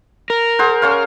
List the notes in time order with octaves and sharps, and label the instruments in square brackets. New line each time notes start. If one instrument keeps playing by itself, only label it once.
[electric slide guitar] A#4
[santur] G#4 C5 F#5
C#4 C#5 F5